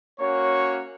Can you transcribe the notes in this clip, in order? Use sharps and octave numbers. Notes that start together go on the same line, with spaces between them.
A#3 C#4 F#4 C#5